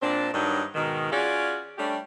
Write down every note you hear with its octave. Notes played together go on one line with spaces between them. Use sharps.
A#2 C4 D4
G2 D#3 F#3 D4 D#4
G#2 B2 D#3
C#4 F4 F#4 G#4 D5
G3 A3 C#4 D4 G4